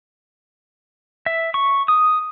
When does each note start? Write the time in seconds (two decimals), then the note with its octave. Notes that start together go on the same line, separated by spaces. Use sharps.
1.26 E5
1.54 C#6
1.88 D#6